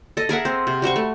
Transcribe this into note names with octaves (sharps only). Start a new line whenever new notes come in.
A4 D#5
G#4 A#4 E5 F#5
C4
C3
G3 F#4 C5 C#6
A3